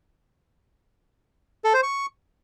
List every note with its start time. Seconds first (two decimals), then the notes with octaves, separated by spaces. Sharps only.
1.64 A4
1.74 C5
1.83 C#6